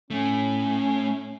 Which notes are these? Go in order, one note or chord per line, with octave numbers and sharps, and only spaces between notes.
A2 A3 C#4